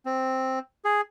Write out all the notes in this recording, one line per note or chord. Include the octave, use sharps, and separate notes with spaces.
C4
G#4